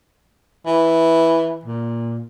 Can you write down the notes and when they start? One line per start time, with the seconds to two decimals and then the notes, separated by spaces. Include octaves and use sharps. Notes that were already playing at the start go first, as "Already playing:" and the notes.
0.66 E3
1.65 A#2